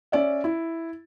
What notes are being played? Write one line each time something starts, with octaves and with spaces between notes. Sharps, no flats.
C#4 D5 E5
E4